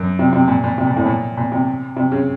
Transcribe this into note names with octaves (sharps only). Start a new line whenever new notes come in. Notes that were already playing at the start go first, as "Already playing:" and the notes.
Already playing: F#2
C3
C3
A#2
A#2
C3
A#2
A2
A#2
A#2
C3
C3
C#3